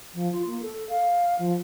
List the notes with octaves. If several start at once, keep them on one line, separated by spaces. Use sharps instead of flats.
F3
F4
A#3
A4
F5
F3